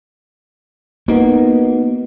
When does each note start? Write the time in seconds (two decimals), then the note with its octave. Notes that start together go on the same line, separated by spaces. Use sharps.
1.08 A#3 B3 D#4 F#4